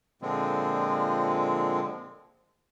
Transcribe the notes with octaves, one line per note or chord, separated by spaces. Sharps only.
A#2 D3 F3 G#3 C4